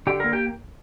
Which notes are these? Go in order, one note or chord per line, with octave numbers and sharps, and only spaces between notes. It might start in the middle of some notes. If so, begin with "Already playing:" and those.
D3 G4 G5
A#3 A#4 A#5
G4 G5